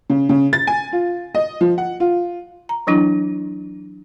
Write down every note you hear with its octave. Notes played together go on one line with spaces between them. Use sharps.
C#3
C#3
A6
G#5
F4
D#5
F3
F#5
F4
A#5
E3 F#3 D4 E4